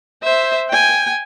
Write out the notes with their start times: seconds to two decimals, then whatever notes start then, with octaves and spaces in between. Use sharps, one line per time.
0.23 C5 E5
0.69 G5 G#5